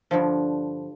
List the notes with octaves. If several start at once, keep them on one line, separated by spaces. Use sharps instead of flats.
G2 D3 F3